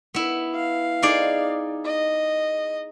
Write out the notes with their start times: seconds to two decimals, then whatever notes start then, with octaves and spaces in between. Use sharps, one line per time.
0.14 B3 E4
0.55 F5
1.02 D#4 G#4 D5
1.85 D#5